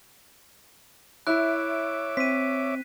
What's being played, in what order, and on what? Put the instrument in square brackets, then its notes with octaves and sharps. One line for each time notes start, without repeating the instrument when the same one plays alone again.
[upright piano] E4 [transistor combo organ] C#5 E5 D6 [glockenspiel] F#6
[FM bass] C4 [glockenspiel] B6 D#7